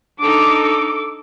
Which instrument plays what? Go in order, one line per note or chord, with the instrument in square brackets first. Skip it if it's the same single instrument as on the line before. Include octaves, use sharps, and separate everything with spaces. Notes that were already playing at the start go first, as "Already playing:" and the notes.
[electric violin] D4 D#4 [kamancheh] A4 D6